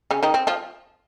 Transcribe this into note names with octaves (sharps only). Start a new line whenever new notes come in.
C#3 C#4
D#3 D#4
C4
F3 F4